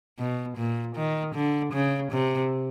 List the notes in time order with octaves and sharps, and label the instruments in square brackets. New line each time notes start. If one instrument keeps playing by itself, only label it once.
[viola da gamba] B2
A#2
D#3
D3
C#3
C3